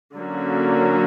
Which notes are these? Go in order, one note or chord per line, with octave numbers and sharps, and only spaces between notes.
D3 F#3 A#3 C#4 F#4